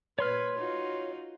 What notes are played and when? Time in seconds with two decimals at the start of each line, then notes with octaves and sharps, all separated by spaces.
0.19 A#2 B4 C#5 C6 F6
0.56 D#4 F4 F#4